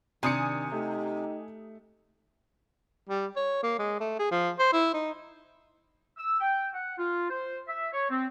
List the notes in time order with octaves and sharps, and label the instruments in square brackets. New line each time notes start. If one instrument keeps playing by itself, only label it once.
[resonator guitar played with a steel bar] C3 [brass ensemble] D#3 [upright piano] D4 [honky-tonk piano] G#5 D#6 C#7
[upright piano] A3 [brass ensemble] D#4 G4
[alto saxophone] G3
C#5
A#3
G#3
A3
G#4
F3
C5
E4
D#4
[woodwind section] E6
G5
F#5
F4
C5
E5
C#5
C4